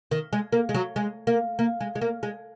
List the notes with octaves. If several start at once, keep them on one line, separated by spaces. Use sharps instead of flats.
D#3
G#3
A#3
G#3
F#3
G#3
A#3
A#3
G#3
G#3
A#3
G#3